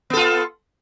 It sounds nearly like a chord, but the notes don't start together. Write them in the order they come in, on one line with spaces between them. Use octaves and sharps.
B3 A4 F4